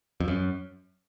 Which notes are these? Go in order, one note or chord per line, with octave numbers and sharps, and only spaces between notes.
F2
F#2